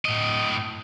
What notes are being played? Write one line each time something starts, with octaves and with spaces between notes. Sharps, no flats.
A2 D#5